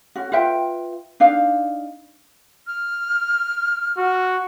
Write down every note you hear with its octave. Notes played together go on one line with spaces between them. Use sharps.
C#4 F#4
F4 B4 E5 G5
D4 D#4 F5
F6
F#4